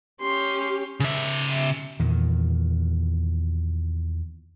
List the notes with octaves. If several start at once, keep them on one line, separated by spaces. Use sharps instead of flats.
C#4 G4 C6
C#3 E5
E2 A#2 D#3